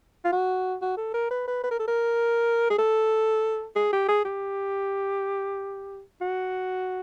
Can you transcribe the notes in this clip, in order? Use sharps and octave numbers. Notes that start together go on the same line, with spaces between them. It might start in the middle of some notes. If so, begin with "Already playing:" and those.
F4
F#4
F#4
A4
A#4
B4
B4
B4
A#4
A4
A#4
G#4
A4
G#4
G4
G#4
G4
F#4